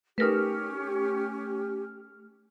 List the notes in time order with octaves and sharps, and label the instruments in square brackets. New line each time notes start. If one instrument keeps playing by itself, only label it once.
[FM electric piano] A3 F6 [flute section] C#4 G4 [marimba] D#4 A#4 B4